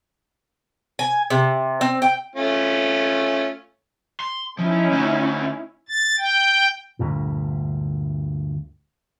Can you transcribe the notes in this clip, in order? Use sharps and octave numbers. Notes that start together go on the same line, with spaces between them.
G#5
C3
C4
G5
A3 C#4 F4
C6
F3 C#4 D#4 E4
D3 A3
A6
G5
D2 G2 A#2